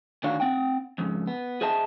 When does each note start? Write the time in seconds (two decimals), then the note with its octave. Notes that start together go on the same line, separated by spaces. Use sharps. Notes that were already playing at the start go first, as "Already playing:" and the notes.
0.23 D2 D#3 D4 F#4 C#5 F5
0.40 C4 F#5 G5
0.98 F2 G#2 C#3
1.27 B3
1.61 G#4 C5 D#5 E5 A5